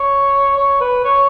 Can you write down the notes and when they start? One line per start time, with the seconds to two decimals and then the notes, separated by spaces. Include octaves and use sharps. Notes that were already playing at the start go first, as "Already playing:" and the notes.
Already playing: C#5
0.57 C#5
0.81 B4
1.05 C#5